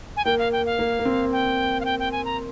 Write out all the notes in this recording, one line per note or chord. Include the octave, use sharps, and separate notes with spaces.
G#5
A#3 G5
F5
G5
F5
A#3
A#3
C4
G5
F5
G5
G5
G#5
A#5